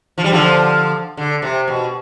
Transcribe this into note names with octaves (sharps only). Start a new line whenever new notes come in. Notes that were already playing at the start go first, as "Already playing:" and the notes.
F3
G3
D3 F3
D3
C3
B2